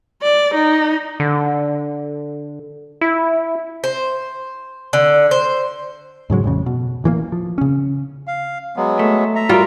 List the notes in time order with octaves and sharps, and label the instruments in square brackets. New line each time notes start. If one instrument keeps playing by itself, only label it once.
[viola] D5
D#4
[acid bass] D3
E4
[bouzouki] C5
D3
C5
[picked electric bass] G#2 C#3 F#3 G#3
A1 F2 C#3
B2
A1 E3 G#3 A#3
F3
C#3 C#4
[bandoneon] F5
F#3 G#3 B3
[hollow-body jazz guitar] A3
[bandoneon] E5 A#5
[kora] G3 F4 [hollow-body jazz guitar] F#4 A#4